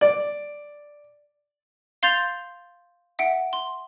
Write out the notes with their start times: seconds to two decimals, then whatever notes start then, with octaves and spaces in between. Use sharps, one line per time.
0.01 D5
2.03 F5 C6 G6 A6 F7
3.19 E5 F#5 D7
3.53 C6